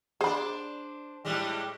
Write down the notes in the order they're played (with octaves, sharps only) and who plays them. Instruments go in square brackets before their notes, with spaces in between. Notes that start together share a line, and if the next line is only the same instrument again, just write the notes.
[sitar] D4 C5 [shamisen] G#4 B5
[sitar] A2 G3 G#3